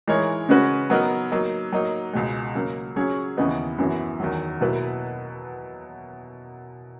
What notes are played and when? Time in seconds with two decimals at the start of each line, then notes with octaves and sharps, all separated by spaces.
0.07 E3 G#3 D#4 A#4 C#5
0.49 C#3 G#3 C#4 F#4 B4
0.90 F#3 B3 D#4 A#4
1.31 F#3 A#3 D#4
1.72 F#3 A#3 D#4
2.13 C#2 B2 G#3
2.55 C#3 F#3 A#3
2.96 F#3 C#4 G#4 C#5
3.37 D#2 C#3 E3 B3 D#4
3.78 F#2 C#3 E3 B3 F#4
4.20 E2 D#3 F#3
4.61 B2 F#3 A#3 E4 B4